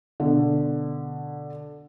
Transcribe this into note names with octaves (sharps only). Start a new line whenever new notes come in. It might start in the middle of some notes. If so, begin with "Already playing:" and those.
B2 D3